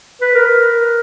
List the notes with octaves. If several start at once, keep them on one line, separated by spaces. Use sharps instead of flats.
B4
A#4